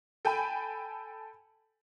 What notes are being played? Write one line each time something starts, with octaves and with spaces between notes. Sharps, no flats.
A4 G5 G#5 B5